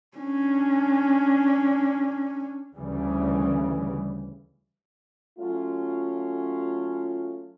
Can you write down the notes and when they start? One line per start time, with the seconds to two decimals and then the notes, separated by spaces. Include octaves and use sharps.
0.17 C#4 D4
2.75 D2 C#3 E3 G3
5.39 F#3 A3 C#4 F4